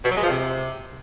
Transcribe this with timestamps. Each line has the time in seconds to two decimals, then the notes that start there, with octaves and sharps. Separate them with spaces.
0.04 B2
0.10 F#3
0.17 G#3
0.23 F3
0.29 C3